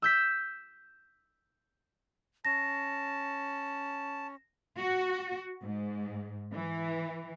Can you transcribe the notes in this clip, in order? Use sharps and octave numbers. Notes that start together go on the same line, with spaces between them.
E6 G6 B6
C#4 A5 A#6
F#4
G#2
E3